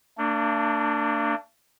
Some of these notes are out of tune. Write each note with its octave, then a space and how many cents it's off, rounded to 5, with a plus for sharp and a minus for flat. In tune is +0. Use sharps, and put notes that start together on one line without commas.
A#3 -45 D4 +0